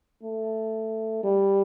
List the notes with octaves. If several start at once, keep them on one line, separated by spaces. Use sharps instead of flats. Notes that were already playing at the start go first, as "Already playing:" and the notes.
A3
G3